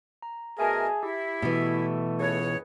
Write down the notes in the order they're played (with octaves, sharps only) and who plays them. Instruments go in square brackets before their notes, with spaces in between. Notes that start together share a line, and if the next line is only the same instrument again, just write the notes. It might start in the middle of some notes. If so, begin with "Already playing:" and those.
[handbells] A#5
[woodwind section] B2 A3 A#4 [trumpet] G#4 [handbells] E5 G#5 A5
[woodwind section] E4 [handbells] G4
[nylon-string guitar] B2 E3 [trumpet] A3
[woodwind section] C#2 C#5 [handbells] G#4 B4